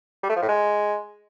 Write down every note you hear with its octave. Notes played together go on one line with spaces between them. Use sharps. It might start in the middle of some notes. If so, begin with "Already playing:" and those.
G3
A3
F3
A2
G#3